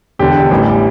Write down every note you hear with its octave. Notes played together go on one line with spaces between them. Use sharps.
E1 E2 D3 G4
A1 A2 E3 G3